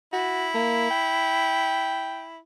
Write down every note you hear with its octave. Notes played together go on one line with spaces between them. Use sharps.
E4 F#4
A#3
G5